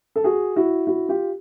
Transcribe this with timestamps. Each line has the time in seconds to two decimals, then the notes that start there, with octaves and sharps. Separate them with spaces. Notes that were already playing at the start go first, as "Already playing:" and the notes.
0.16 A4
0.24 F#4 G#4
0.56 E4 F#4
0.87 E4 F#4
1.09 F4 G4